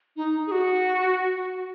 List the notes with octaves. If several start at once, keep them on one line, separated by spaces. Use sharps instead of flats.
D#4
G#4
F#4